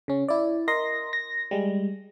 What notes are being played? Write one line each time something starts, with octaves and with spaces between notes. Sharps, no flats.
C#3 C#4
E4 D5
A#4 D#5 C6 A#6
A#6
G3 G#3